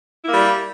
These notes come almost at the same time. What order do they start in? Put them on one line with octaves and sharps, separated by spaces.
E4 A#3 G3